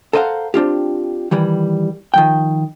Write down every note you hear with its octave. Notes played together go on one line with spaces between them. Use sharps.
A4 A#4 C5 D#5 F5 F#5
C4 D4 F4 G4
D#3 E3 G3
D#3 F3 G5